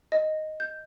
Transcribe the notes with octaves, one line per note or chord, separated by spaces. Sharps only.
D#5
G6